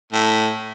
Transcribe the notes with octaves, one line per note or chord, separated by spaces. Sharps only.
A2